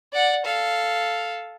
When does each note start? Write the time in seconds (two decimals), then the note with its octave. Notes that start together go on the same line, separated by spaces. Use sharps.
0.13 D5 F#5
0.46 A4 F5